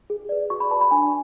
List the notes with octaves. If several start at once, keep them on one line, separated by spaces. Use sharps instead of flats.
G#4
B4 D5
F#4 C#6
B5
B4 D5 A5
B5
D4 G#5